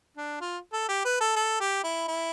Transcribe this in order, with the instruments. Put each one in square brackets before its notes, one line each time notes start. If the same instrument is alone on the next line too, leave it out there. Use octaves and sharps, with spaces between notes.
[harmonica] D4
F4
A4
G4
B4
A4
A4
G4
E4
E4